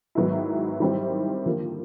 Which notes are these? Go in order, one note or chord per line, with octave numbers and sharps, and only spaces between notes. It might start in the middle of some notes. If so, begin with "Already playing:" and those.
G#2 D#3 F#3 B3 E4
D#3 G3 C4 E4
D3 F3 A#3